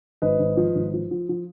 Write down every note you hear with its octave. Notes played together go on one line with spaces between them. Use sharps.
G#1 B4 D#5
G#1
F3
G#1
F3
F3
F3